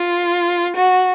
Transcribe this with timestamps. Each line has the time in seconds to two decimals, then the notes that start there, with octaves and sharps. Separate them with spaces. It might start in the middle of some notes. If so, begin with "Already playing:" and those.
Already playing: F4
0.76 F#4